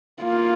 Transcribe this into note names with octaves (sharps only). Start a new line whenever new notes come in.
A#3 F4